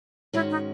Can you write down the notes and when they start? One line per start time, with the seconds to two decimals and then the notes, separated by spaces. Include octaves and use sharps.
0.33 G#2 D#3 G#3 C#4 E4 F#4
0.50 D#4